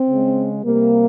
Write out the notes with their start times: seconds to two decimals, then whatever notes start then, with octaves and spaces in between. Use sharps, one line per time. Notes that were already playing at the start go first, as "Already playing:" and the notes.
Already playing: C4
0.10 C#3 G#3
0.64 C3 G3 A#3